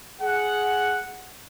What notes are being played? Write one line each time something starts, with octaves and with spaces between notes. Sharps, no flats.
G#4 F#5